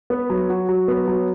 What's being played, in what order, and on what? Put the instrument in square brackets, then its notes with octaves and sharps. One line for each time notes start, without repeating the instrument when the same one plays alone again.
[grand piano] B3
F#3
F#4
F#3
B3
F#3